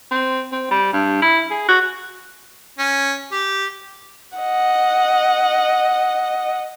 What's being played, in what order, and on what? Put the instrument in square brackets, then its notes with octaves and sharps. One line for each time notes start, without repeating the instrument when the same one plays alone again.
[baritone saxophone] C4
C4
G3
G2
E4
G#4
F#4
[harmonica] C#4
G4
[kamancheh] D#5 F#5